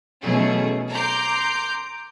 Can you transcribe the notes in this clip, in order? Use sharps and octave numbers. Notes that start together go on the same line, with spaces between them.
B2 E3 F#3 A3 C#4 G#4
A#5 C6 D6 G6